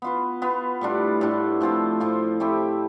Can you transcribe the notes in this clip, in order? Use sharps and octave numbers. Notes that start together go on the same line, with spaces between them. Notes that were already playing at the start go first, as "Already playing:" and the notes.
B3 F4 B4
B3 F4 B4
A2 G3 D4 F4
A2 G3 D4 F4
A2 F3 C4 F4
A2 F3 C4 F4
A3 C4 E4 G4